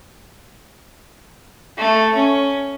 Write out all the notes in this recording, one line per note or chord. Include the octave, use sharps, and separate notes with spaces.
A3
C#4